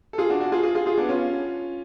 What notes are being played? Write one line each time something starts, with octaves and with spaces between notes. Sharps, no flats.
A4
F4 G#4
D4 F#4
D4 F#4
F4 G#4
F4 G#4
F4 G#4
F4 G#4
B3 D4
C#4 F4